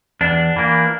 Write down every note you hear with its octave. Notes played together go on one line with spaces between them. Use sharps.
E2 D4
E3 A#3